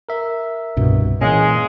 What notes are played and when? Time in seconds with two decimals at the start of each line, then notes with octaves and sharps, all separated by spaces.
0.09 A#4 E5
0.76 C2 G2 B2
1.21 A#2 E3 G#3 C#4 F5